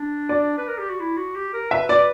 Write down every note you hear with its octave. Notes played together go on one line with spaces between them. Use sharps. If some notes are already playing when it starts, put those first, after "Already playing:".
Already playing: D4
D5
B4
A#4
G4
F#4
E4
F#4
G4
A#4
B4 E5
D5